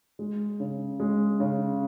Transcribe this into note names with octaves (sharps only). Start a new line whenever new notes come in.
G#3
C#3
G#3
C#3